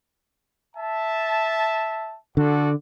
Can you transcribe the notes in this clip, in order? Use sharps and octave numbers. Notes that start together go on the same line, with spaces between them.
E5 A5
D3 F#4 A4 D5